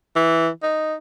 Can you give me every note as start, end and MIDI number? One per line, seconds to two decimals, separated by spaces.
0.16 0.49 52
0.63 0.94 63